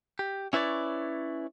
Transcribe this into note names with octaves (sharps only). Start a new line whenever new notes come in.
G4
C#4 E4 B4 C#5 D5